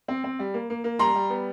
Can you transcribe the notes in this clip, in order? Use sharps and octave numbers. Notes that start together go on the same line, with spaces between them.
C4
C4
G3
A#3
A#3
A#3
G3 A#5 C6
G3
B3